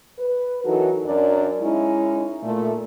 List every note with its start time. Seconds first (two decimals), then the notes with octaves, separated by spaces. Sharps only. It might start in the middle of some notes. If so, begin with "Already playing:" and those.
0.19 B4
0.65 E3 F#3 D#4 F#4 A4 A#4
1.06 F#2 D4 A#4 D5
1.61 G#3 C#4 D#4 E4
2.43 A#2 A3